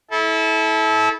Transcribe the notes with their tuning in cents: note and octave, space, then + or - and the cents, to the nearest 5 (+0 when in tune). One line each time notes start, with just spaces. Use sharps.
E4 -25 A4 -25